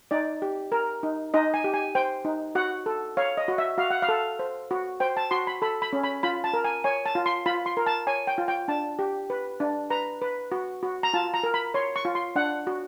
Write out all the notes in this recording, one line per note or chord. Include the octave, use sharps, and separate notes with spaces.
D#4 D5
G4
A#4
D#4
D#4 D#5
G#5
G4
G#5
C5 G5
D#4
F#4 F#5
A4
C#5 F5
D#5
F#4
E5
F#4 F5
F#5
F5
A4
C5
F#4
C5 G5
A5
F#4 C6
B5
A4 B5
B5
C#4
B5
F4 B5
A5
A#4
G#5
C#5 G#5
A5
F4
C6
F4 B5
C6
A#4
A5
C#5 G#5
G5
F4
G5
D4 A5
G4
B4
D4
B4 A#5
B4
F#4
F#4
A#5
F4 A5
A#5
A#4
B5
C#5 C6
C#6
F4
C6
D4 F#5
F#4